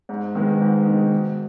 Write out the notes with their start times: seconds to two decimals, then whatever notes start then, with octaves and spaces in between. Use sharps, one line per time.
0.09 G#2
0.35 D#3 G#3 B3
0.61 G#2
0.86 D#3 G#3 B3
1.12 B2